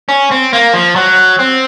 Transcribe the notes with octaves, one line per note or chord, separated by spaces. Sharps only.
C#4
C4
A#3
F3
F#3
C4